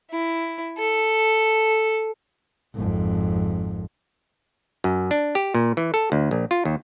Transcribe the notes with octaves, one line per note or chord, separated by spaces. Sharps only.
E4
A4
G#1 F2
F#2
D4
G4
A#2
E3
A4
D2
A#1
F4
D#2